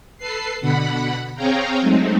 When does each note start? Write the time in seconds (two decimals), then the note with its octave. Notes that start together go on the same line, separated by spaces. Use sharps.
0.18 A4 B4 C7
0.61 B2 D3 F#5 B5
1.35 C4 G#4 C#5 F5 G5 A#5
1.81 F#3 G#3 A3 C4 D#4